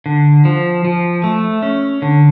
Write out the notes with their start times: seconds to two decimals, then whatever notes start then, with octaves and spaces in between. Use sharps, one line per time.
0.06 D3
0.45 F3
0.85 F3
1.24 A3
1.63 C#4
2.02 D3